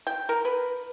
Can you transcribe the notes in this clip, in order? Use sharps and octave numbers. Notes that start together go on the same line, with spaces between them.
G5
A#4
B4